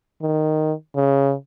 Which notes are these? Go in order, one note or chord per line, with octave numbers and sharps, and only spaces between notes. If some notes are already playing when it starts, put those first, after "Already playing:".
D#3
C#3